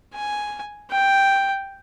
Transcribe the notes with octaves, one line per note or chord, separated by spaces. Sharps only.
G#5
G5